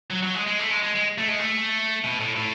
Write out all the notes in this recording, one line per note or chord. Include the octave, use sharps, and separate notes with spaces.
F#3
F#3
G#3
G#3
A3
G#3
G#3
G#3
A3
G#3
A3
B2
A2
A2